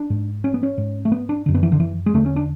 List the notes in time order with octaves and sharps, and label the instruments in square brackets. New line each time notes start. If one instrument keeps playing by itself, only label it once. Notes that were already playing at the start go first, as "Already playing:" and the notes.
Already playing: [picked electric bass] D4
G#2
C#4
B3
C#4
G#2
A3
B3
D4
F#2 D3
B3
E3
D3
E3
G#3
E2 D3 A3
C#4
D4